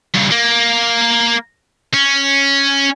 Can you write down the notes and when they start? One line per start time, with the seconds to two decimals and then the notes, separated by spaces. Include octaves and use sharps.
0.15 G2 C#3
0.31 A#3
1.94 C#4